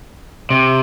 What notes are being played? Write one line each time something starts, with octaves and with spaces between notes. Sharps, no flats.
C3